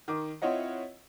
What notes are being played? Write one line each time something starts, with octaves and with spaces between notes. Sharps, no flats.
D#3 D6
C4 E4 F4 C#5 D#5 F#5